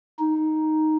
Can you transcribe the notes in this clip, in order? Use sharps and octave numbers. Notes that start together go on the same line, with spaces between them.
D#4